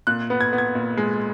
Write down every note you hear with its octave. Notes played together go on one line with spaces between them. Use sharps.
A#2 F#6
B3
G#6
B3
G#6
A#2
G#3